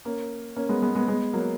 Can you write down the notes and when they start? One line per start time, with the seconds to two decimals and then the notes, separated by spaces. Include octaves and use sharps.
0.05 A#3 C#4
0.56 A#3 C#4
0.69 G#3 B3
0.82 G#3 B3
0.95 G#3 B3
1.08 G#3 B3
1.33 F#3 A#3